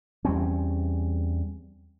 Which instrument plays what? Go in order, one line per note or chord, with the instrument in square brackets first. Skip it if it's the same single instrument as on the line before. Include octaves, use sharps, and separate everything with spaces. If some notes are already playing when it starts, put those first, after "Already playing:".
[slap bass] E2 G3 C4 C#4